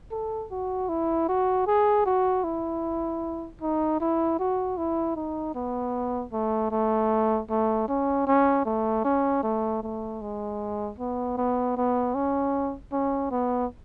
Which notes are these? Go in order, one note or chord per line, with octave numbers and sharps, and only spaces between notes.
A4
F#4
E4
F#4
G#4
F#4
E4
D#4
E4
F#4
E4
D#4
B3
A3
A3
A3
C#4
C#4
A3
C#4
A3
A3
G#3
B3
B3
B3
C#4
C#4
B3